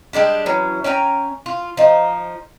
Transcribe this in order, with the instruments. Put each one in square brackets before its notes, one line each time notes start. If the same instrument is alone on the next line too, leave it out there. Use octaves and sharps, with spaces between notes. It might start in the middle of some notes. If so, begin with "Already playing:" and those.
[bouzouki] G3 G#3 D4 G4
E3 F#3 C#4
C#4 G5 G#5 A#5
F4
F3 D#4